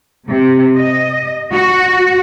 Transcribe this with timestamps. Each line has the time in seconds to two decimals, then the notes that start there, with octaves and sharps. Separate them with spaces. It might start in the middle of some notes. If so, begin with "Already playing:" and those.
0.30 C3
0.78 D#5
1.53 F#4